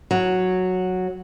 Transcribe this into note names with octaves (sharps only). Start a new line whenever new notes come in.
F#3